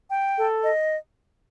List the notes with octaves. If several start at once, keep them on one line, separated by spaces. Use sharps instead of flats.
G5
A4
D#5